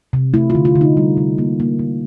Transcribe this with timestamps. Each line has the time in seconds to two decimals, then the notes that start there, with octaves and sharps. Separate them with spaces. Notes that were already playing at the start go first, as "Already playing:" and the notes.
0.13 C3
0.34 A3 E4
0.50 F4
0.55 D3
0.65 F4
0.76 D3
0.81 D#4
0.97 G3
1.17 C3
1.38 A#3
1.60 A#3
1.79 D3